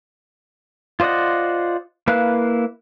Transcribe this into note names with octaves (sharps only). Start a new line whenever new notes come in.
F4 C5 D5 D#5 F#5
A#3 E4 B4 F5 F#6